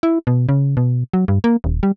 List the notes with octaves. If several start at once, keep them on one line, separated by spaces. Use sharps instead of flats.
E4
B2
C#3
B2
F#3
G2
A#3
D#1
G3